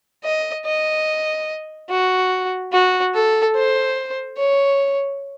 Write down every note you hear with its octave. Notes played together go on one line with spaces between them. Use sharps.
D#5
D#5
F#4
F#4
A4
C5
C#5